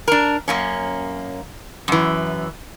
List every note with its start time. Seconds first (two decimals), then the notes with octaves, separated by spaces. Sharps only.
0.08 D4 A#4
0.48 F#2 A#3 C#4
1.88 F#2 E3